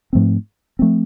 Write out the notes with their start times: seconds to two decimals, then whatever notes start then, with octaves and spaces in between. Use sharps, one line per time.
0.13 G#2 F3 A3 C4
0.79 F3 A3 C4